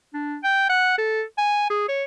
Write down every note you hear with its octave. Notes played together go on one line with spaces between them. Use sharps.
D4
G5
F#5
A4
G#5
G#4
C#5